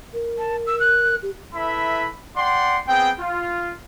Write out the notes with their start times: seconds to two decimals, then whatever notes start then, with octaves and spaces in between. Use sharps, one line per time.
0.14 A#4
0.38 A5
0.67 E6
0.80 F#6
1.22 G4
1.55 E4 A4 B4 E5 B5
2.37 D5 F#5 G5 C6
2.88 B3 C4 G#4 G5
3.20 F4